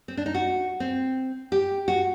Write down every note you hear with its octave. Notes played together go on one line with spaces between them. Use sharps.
C4
D4
D#4
F#4
C4
G4
F#4